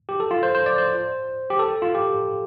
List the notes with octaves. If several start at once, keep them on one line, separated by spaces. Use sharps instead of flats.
G4
A4
F4
C5
C5
D5
C5
G4
A4
F4
G4